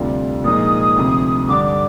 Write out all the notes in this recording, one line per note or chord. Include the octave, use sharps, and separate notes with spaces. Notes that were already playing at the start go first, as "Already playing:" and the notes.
Already playing: D2 C3 G3 D4 F4
A#2 F3 G#3 D#4 D#6
D2 C3 F3
G2 D3 G3 D4 D6
D6